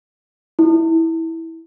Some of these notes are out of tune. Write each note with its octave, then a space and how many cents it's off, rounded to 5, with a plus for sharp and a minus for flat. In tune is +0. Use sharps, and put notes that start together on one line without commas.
E4 -15